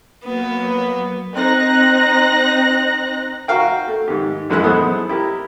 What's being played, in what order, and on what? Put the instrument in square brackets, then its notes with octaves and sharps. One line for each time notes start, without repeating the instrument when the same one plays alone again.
[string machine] F#3 A#3 [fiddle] B3
[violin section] C4 D#4 F#6 A#6
[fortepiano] F#4 A#4 F5 G5
A3
G#2 D#3 G4
A#1 F#2 E3 G#3 E6 F#6
B3 A4 C5 D#6
E4 G4 A#4